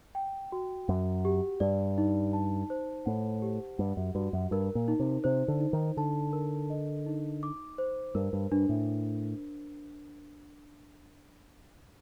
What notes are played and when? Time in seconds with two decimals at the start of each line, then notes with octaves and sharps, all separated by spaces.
0.15 G5
0.52 F#4
0.88 F#2 F#5
1.25 G4
1.60 G2 D5
1.98 D#4
2.33 A5
2.70 C5
3.06 A2 F#5
3.42 G4
3.78 G2 F#5
3.97 F#2
4.15 G2 F#4
4.33 F#2
4.51 G2 A#4
4.75 A#2
4.88 D#4
5.00 C3
5.24 C3 C5
5.48 D3
5.60 D#4
5.73 D#3
5.97 D3 A5
6.33 A#4
6.70 D#5
7.06 D#4
7.43 D6
7.78 C5
8.15 G2 A#4
8.33 G2
8.52 G2 D4
8.69 A2